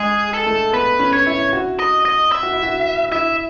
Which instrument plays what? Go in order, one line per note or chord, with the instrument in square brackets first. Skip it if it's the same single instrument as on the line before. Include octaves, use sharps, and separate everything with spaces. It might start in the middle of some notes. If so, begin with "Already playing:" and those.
Already playing: [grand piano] G#3 [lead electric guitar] G#4
[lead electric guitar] A4
[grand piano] A3
[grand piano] B3 [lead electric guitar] B4
[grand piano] C#4
[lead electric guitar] C#5
[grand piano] E4
F#4
[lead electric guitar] D#5
D#5
E5
[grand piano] F#4
E4
F#4
[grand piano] E4 [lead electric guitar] E5